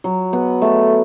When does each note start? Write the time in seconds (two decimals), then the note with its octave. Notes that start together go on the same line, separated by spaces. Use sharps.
0.04 F#3
0.33 B3
0.62 A3